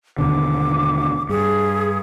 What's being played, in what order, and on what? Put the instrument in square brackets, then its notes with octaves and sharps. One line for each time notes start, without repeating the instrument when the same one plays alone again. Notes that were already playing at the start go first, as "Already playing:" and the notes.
[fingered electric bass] D#2 B2 D3 [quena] D6
[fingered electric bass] G2 [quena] G#4